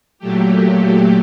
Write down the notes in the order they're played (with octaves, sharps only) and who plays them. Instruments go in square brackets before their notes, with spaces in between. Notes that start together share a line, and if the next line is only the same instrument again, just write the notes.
[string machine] A#2 F#3 A3 G4